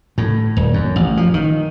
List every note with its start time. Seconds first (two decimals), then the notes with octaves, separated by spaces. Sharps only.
0.18 A2
0.57 D#1
0.74 F#2
0.96 A1
1.17 F3
1.34 D#3